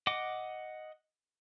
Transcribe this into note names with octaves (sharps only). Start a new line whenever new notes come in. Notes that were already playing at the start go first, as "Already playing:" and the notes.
D#5 F#5 D6